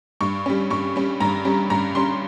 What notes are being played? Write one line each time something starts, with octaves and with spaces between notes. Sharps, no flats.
G2 C#6
G3 C#4
G2 C#6
G3 C#4
G2 A#5
G3 C#4
G2 A#5
G3 C#4 C6